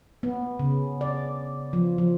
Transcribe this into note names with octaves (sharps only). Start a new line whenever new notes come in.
B3
C#3
D5
F3
F3